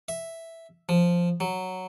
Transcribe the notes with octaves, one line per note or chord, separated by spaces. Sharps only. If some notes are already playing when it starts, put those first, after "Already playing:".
E5
F3
F#3